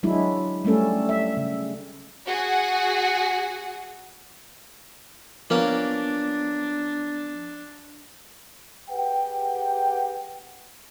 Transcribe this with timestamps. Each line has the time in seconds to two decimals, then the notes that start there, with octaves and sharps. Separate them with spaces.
0.03 F#3 G#3 D4 E4
0.65 G3 A3 C#4 A4
1.09 E5
1.37 C#3
2.26 F#4 G#4 F#5
5.50 F3 A#3 B3 C#4 D4 A#4
8.90 G4 G#4 B4 F#5 G5